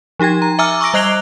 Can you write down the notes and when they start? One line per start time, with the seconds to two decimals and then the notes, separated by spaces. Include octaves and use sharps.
0.19 F3 D#4 G4 G5 G#6
0.42 A#5
0.59 E5 G#5 A#5 D6 E6 F6
0.81 C#6 D6 E6 A#6 D7
0.94 G3 D#5 F#6 C7 F7 G7